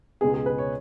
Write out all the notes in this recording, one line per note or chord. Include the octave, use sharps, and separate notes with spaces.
C#2 B2 G#3 B3 G#4
G#4
B4
C#5